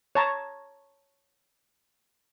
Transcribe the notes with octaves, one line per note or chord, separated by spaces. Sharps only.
C#5 A5 A#5